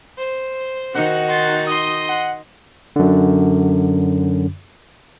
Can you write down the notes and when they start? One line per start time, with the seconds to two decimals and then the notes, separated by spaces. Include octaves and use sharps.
0.18 C5
0.95 D#3 D#4 F#4 F#5
1.29 F#5 C6 A6
1.67 D#5 C6 D#6
2.09 F#5
2.96 F#2 D3